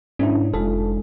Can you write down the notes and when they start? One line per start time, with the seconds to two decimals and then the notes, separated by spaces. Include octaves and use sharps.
0.19 G#2 C#4 D4 E4
0.54 F1 G#3 D#4 F4 A4